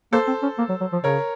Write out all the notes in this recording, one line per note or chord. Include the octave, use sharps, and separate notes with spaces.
A#3 A4 C5
C4
C#4
A#3
F#3
F#3
F3
C#3 A#4 C#5